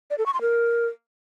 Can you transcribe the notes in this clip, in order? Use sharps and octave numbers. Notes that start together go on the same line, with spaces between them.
D5
A4
C#6
C6
A#4